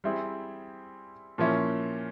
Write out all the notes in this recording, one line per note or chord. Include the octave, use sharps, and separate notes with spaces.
G3 C4 E4 G#4
A#2 F3 A#3 C#4 E4